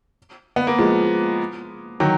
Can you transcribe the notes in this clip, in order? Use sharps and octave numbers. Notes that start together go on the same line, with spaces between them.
B3
A#3
F3 G#3
D#3 F#3